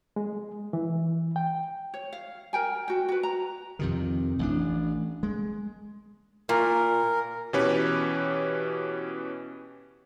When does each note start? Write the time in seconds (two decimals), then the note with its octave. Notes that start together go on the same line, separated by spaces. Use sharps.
0.16 G#3
0.73 E3
1.36 G5
1.94 C#5
2.13 F5
2.53 A#4 G5 G#5
2.88 F#4 G5
3.08 F#4 B4
3.23 A#5
3.79 F2 C3 D#3
4.39 A1 E3 A3 D4
5.23 G#3
6.49 A#2 A#4
7.53 B2 E3 C#4 G4 B4 C#5